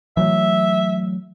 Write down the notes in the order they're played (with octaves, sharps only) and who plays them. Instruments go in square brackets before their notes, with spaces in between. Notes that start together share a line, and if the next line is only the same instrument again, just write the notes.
[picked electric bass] E3 F#3 A3 [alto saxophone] E5